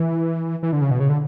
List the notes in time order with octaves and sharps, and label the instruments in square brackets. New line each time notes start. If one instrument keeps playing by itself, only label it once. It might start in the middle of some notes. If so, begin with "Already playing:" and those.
Already playing: [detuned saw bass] E3
E3
D3
C#3
B2
C#3
D3